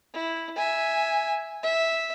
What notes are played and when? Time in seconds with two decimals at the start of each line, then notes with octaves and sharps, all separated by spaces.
0.14 E4
0.56 E5 G#5
1.63 E5